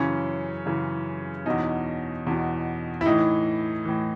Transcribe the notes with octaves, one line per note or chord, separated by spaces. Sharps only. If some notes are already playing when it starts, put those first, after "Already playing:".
Already playing: F#2 C#3 E3 C#4
F#2 C#3 E3
E2 B2 D#4
E2 B2
E4
A2 E3 D#4
A2 E3